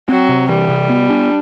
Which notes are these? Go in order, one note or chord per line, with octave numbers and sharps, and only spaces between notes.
F#3 C4
C3
E3 G3
C3
B3
D4